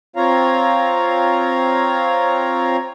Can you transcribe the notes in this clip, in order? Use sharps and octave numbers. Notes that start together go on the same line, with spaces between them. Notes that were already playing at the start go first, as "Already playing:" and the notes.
C4 F4 C#5 F5 A#5